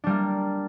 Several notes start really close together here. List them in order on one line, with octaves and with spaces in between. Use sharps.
D4 G3 A#3